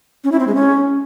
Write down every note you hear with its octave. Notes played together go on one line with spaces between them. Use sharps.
C#4
E4
C4
G#3
C#4